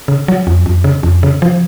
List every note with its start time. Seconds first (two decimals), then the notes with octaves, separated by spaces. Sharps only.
0.08 C#3
0.28 F#3
0.47 F2
0.66 F2
0.84 C#3
1.03 F2
1.23 C#3
1.42 F3